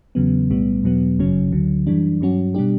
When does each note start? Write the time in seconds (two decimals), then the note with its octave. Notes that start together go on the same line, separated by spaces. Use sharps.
0.15 E2 C#3 F#3 B3
0.50 B1 A2 G3 B3
0.84 E2 B2 F#3 B3
1.19 G1 F#2 C#3 F#3 C#4
1.52 D2 D3 F#3
1.87 F#2 E3 G3 D4
2.20 G2 F#3 C#4 F#4
2.54 B2 G3 D4 G4